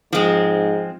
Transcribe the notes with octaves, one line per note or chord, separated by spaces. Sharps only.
G#2 F3 G#3 C4